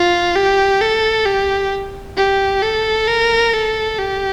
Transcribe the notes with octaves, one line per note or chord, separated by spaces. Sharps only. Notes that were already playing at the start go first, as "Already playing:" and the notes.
Already playing: F4
G4
A4
G4
G4
A4
A#4
A4
G4